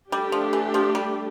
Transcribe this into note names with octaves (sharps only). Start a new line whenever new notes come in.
G3 A3 D4 G4
F3
E3
F3
G3